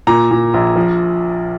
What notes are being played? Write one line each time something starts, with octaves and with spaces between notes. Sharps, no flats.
A#2 A#5
A#2
A#1
F3